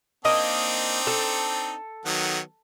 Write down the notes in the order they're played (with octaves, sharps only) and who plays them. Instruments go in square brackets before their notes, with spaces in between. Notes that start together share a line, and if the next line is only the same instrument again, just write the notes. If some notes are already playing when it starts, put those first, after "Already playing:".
[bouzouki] A#3 D#5 [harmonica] C4 D4 D#4
[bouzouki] A4
[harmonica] D#3 F#3 B3